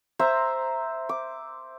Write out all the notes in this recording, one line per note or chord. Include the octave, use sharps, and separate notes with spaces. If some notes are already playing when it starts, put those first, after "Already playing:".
C5 E5 A#5
D6